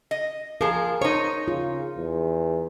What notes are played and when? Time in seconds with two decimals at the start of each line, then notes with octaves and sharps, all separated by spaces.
0.11 D#5
0.61 F3 G#4 A#4
1.01 D#4 C5 C#5
1.48 C#3 F4
1.97 E2